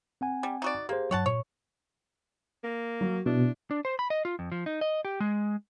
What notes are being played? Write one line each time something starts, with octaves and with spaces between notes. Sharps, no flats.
C4 F#5 G#5
G3
D#4 F#4 D5
A#3 G4 G#4 C5
G2 F#3 C#5 F#5 A5
A#2 C#5
A#3
F#3
B2 D4 E4
D4
C5
B5
D#5
F4
F2
F3
D#4
D#5
G4
G#3